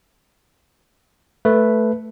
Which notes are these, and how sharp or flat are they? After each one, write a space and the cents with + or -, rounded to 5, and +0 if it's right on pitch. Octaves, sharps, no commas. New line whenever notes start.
A3 +0 B4 +0